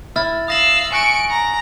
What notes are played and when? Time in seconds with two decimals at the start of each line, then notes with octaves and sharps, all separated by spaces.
0.16 E4 E6 F6 A6
0.48 F5 D#6 E6 A#6 F#7
0.92 G#5 C#6 F#6 A#6 D7
1.30 A#5